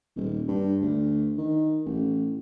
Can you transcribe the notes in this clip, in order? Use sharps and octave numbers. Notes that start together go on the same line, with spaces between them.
D#1
G2
D2
D#3
A1